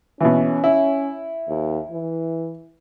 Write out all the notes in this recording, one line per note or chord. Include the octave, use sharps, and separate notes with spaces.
B2 E3 C#4
E4
D#2
E3